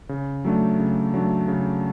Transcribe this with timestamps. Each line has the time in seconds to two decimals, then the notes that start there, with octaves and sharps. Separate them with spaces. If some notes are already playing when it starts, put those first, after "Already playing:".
0.09 C#3
0.44 F#3 A3 D4
0.79 C#3
1.14 F#3 A3 D4
1.48 C#3